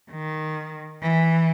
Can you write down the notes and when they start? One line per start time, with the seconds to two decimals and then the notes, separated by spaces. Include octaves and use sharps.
0.11 D#3
1.02 E3